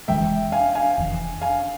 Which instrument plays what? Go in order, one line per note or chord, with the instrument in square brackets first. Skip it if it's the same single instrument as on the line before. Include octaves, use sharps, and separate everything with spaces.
[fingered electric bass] F1 F2 E3 G#3 [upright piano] E5 G5
[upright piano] F5 G#5
F5 G#5
[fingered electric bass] F1 F2 E3
[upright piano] F5 G#5